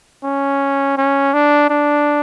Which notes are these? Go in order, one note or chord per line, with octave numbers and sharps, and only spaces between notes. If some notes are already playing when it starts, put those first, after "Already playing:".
C#4
C#4
D4
D4